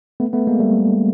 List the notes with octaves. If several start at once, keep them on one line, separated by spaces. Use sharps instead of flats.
A3 B3
A3 B3
G#3 A#3
G3 A3